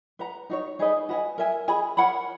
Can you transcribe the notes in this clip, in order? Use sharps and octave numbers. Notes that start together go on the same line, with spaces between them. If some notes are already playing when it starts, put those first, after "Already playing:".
B4 F#5 A#5
D#4 F#4 C#5
D#4 G#4 B4 D#5
F#4 B4 D#5 G#5
A#4 E5 G#5
G#4 D#5 G#5 B5
A#4 C#5 F#5 B5